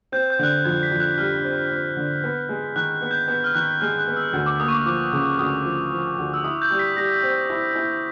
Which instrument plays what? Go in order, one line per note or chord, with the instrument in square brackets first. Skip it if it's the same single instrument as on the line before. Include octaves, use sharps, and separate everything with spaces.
[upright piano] C4 [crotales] G6
[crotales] G6
[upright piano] D3 [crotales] F#6
[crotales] G6
[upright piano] F2 [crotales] G#6
[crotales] B6
[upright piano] F2
[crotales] F#6
[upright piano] G3 [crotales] F6
[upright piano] C4
C4
D3
B3
G#3
[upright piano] D#3 [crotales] F#6
[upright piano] B3
[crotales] G6
[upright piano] B3 [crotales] G6
[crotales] F6
[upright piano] D#3 [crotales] F#6
[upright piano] G#3 [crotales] F6
[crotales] F#6
[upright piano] B3
[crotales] E6
[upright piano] D2
[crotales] D6
[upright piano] A#3 [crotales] D#6
[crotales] C#6
D6
[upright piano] F3 [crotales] D6
[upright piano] C#3
[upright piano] D2 [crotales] D#6
[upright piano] F3
F3
D2
[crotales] E6
[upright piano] E4 [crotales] D#6
[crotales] G6
[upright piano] G3
[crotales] B6
[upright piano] G3 [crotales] A#6
[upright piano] C4
E4
E4